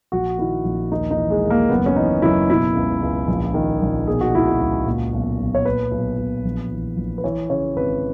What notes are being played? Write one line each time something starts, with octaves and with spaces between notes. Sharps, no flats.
A#1 F#4
D#3 E4
A#1
D#2 D#4
D#4
E3
G#3
D#2
A#3
F#1 B3
C#4
E3 D#4
F#1 E4
B2 E4
C#2
C#2
A#1
D#3
A#1
B2 G#4
F#4
C#2 E4
F#4
C#2
A#2
B1
B1
C#5
A#2 B4
B1
B1
A#1
E3
A#1
B4
E3 C#5
C#3 C#5
G#1 B4